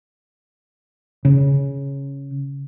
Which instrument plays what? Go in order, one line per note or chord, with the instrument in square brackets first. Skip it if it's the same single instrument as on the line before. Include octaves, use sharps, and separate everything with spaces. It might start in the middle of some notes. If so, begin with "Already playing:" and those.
[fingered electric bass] C#3